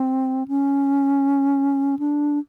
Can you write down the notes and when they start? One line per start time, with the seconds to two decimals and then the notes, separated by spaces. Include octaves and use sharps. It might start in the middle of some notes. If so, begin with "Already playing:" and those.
Already playing: C4
0.48 C#4
1.99 D4